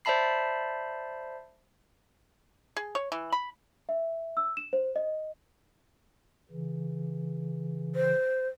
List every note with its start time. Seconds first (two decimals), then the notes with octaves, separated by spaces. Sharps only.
0.05 C5 D5 E5 A5 B5 C7
2.77 G#4
2.95 C#5
3.12 E3
3.32 B5
3.89 E5
4.37 E6
4.57 E7
4.73 C5
4.96 D#5
6.51 C#3 E3
7.95 C5